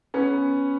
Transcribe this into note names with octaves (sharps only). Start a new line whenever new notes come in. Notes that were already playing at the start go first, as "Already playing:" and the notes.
B3 C#4